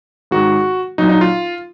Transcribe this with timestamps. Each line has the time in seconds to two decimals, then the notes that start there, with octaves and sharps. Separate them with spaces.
0.31 G#2 D#3 G#3 F#4
0.98 A#2 F#3 D#4
1.09 D#4
1.21 F4